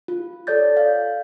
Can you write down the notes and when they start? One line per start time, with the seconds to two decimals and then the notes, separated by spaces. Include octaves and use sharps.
0.08 F4
0.47 A4 C#5 D5 G6 A6
0.77 F5